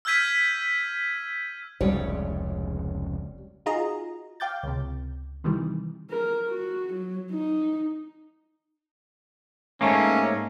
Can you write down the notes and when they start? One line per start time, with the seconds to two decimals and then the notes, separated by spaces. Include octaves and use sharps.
0.05 E6 F6 G6 G#6 B6 D#7
1.81 F1 C#2 C#3 G3 C#5 D5
3.66 D#4 F4 F#4 G#4 D#5 A#5
4.40 F5 G5 D6 G6 A6
4.63 C#2 C3
5.44 C3 D#3 E3 G3
6.10 A#4
6.48 F#4
6.93 F#3
7.31 D#4
9.81 G#2 A3 A#3 C#4